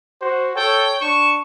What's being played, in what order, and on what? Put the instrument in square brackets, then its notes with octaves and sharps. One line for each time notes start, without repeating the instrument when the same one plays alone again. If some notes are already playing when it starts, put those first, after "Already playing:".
[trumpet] F#4 [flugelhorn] C5
[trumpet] A4 [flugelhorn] C#5 [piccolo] G5
[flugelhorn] D4 [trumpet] C#6 [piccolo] E7